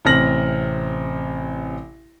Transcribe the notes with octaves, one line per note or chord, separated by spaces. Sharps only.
A1 C3 C4 F6 A#6 F#7